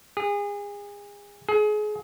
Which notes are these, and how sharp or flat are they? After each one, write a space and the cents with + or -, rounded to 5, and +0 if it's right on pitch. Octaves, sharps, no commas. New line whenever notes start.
G#4 -30
G#4 +30